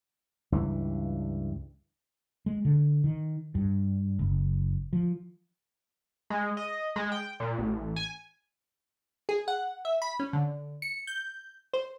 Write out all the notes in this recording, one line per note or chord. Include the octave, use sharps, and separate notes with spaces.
C#2 G2 E3
G#3
D3
D#3
G2
F#1
F3
G#3
D#5
G#3
G5
A#2
A1
G#5
G#4
F#5
E5
B5
C#4
D3
C#7
G6
C5